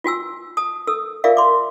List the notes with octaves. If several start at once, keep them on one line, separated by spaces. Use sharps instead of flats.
F4 F#4 G#5 E6
A5 D#6
A4 D#6 E6
F4 G#4 A#4 D5 E5 F5
C6 D6